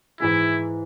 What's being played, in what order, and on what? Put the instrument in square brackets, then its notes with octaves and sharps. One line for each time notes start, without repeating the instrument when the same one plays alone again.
[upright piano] G#2 E3 G#3 [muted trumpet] E4